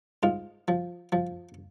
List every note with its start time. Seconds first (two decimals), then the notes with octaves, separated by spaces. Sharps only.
0.23 G#2 F4
0.68 F3
1.12 F3